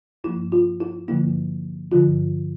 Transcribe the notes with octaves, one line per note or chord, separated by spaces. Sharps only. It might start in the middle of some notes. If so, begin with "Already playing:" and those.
G2 F3 A#3 E4
F4
E4
G2 D3 F3 A#3 E4
G2 D3 F3 F4